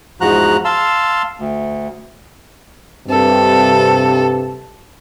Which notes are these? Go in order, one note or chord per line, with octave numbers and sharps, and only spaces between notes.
E2 G#2 F3 F#4 A#5 F#6
F5 A5 C6 E6
D2
G2 C3 A4